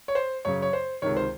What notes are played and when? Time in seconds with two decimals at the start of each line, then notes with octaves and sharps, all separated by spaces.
0.08 C#5
0.15 C5
0.45 F#2 C#3 C#5
0.62 C#5
0.73 C5
1.02 C#2 C3 D#3 C#5
1.17 C5